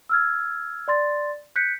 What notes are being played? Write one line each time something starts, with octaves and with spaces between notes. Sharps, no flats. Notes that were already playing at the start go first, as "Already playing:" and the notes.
E6 F6 G#6
D5 C6 A6
F#6 G6 B6 C#7